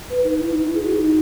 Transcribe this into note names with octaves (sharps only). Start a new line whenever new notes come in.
B4
D#4
E4
D#4
E4
G#4
F#4
D#4